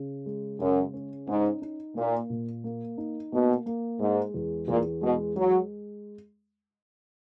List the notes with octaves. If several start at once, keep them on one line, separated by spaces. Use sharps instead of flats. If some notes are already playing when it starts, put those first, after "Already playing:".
Already playing: C#3
G#3
F#2 C#3
C#4
G#2 D#4
D#4
A#2 A#3
A#2
A#3
D#4
B2 A#3
A#3
G#2 G#3
E2
E2 A#2
B2 G#3
F#3 G#3